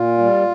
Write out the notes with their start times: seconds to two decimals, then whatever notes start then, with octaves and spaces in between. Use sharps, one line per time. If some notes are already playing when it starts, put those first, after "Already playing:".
Already playing: A#2 F4
0.18 G3